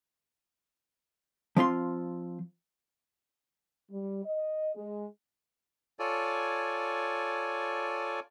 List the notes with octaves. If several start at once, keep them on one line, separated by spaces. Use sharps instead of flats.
F3 C4 F4 C6
G3
D#5
G#3
F4 A4 C#5 D5 G#5